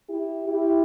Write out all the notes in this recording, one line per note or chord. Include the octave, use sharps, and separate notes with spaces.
E4 G4
E4 G4